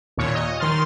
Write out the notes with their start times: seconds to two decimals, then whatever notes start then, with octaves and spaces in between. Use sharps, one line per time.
0.17 D#2 A#2 C#5 C#7
0.35 D#5
0.59 D#3 C6 F6 A6